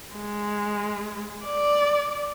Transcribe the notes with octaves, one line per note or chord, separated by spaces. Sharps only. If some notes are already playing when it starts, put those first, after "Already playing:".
G#3
D5